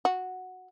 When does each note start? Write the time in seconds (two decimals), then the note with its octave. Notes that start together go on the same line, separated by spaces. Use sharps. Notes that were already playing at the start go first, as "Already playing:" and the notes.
0.05 F#4